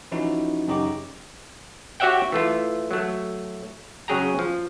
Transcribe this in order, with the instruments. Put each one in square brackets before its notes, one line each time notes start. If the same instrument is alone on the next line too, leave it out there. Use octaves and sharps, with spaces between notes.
[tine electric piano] E3 F3 C#4 D#4 E4 F#4
F#2 C#3 D#4 G4 A#5 D6
[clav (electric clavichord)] F#4 G4 C#5 E5 F#5 G5
E3 A3 F4
F#3 A3
C#3 F#3 G#4 G5 A#5
F3